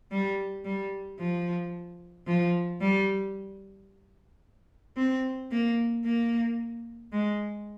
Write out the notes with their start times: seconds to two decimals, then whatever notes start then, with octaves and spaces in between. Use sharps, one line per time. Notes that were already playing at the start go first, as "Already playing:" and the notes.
0.11 G3
0.65 G3
1.19 F3
2.27 F3
2.80 G3
4.96 C4
5.51 A#3
6.04 A#3
7.12 G#3